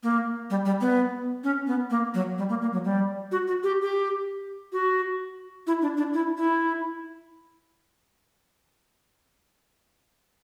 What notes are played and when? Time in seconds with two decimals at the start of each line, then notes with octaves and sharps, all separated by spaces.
0.03 A#3
0.50 G3
0.65 G3
0.81 B3
1.44 C#4
1.67 B3
1.90 A#3
2.14 F#3
2.38 G3
2.49 A#3
2.61 A#3
2.73 F#3
2.85 G3
3.32 F#4
3.47 F#4
3.63 G4
3.81 G4
4.73 F#4
5.67 E4
5.82 D4
5.97 D4
6.14 E4
6.37 E4